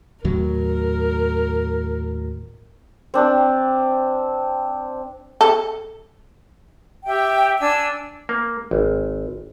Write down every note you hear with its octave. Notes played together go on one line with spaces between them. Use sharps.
D#2 A2 F#3 A#4
C4 D4
A4
G4 E5 G5
D4 G#5 E6
A#3
G#1